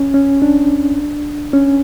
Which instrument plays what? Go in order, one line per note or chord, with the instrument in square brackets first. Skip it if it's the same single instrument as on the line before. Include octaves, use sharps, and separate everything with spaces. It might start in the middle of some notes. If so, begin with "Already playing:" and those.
Already playing: [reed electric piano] C#4
C#4
D4
C#4